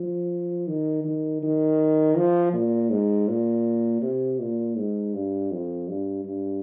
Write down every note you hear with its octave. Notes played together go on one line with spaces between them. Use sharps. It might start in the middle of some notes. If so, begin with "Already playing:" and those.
Already playing: F3
D#3
D#3
D#3
F3
A#2
G#2
A#2
C3
A#2
G#2
G2
F2
G2
G2